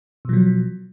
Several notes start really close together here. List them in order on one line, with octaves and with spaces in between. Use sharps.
B2 F3 F#3